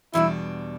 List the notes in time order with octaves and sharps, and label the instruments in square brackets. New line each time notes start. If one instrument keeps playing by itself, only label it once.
[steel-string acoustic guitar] E2 B2 G3 D4 [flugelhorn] E4